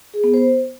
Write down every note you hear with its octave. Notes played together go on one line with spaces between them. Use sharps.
G#4
B3
C5